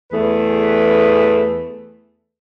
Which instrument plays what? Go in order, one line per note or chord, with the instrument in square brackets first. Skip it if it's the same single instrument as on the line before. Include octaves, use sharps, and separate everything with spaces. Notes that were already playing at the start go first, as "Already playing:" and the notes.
[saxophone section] E2 A3 G#4 B4